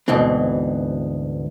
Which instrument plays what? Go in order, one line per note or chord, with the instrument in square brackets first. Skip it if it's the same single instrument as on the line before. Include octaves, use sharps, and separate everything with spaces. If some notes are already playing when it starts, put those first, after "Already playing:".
[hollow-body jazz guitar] D2 G#2 B2 E3 C4